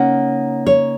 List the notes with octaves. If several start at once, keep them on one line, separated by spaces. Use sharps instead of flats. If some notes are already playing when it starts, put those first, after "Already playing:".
Already playing: C#3 A#3 D#4 F#5
C#5